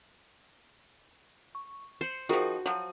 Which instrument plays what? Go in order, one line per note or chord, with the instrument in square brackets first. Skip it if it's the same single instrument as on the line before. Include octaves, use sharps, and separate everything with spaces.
[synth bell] C#6
[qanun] C5 [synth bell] C7 C#7 F#7
[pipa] D#3 F3 [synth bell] F4 G#4 A#4 [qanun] F#4
[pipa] F3 F#3 [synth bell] F4 C#5